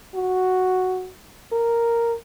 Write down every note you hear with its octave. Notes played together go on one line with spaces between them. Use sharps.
F#4
A#4